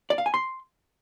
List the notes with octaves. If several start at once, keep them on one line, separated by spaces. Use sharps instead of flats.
D5
F5
G#5
C6